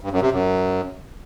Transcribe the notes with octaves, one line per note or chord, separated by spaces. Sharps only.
G2
F#2
C3
F#2